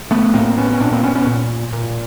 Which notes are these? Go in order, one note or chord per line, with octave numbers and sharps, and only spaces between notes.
A3 B3
A2 A#3 C4
B3 C#4
C#4
A#2 C4 D4
A#3 C4
B3 C#4
B3 C#4
A#2
A#2